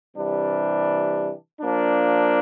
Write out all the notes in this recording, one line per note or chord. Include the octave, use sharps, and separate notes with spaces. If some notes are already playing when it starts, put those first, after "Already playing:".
C3 E3 G3 D4
F3 A#3 D4